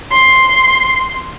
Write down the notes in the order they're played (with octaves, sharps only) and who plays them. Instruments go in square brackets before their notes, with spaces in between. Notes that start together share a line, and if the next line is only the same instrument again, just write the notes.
[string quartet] C6